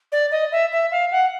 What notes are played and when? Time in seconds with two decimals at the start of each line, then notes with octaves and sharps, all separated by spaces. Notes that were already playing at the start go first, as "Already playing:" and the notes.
0.12 D5
0.31 D#5
0.52 E5
0.72 E5
0.92 F5
1.12 F#5